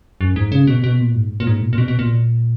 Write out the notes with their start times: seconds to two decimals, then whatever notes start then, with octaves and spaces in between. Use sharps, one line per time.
0.21 F#2
0.36 G#2
0.52 C#3
0.67 B2
0.84 B2
1.00 A#2
1.15 G#2
1.40 A#2
1.47 G#2
1.62 A#2
1.73 A#2
1.78 B2
1.88 B2
1.99 A#2